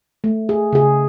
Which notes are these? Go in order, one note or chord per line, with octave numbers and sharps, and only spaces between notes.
A3
G#4
C#3 G#4